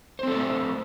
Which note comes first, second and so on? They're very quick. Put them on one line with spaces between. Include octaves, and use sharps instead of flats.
C5 C4 A4 D5 A3